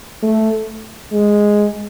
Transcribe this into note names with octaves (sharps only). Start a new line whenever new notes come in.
A3
G#3